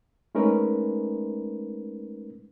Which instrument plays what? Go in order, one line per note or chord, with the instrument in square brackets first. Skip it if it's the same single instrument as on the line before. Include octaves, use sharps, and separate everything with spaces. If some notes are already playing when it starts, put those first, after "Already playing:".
[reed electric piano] G#3 A3 C#4 D#4 A#4 B4